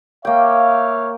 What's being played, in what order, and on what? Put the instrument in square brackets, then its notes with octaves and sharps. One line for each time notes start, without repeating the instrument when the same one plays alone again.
[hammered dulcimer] A#3 G5 [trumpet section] C#5 E5 F5